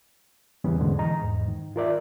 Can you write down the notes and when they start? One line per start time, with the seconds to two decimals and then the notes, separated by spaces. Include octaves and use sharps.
0.64 E2 C#3 E3 G3 B3 C#4
0.79 E2 G#2 B2 D3 G#3
0.98 E3 D#5 A#5
1.22 E2 G#2
1.48 D#3
1.76 F4 A#4 D5 E5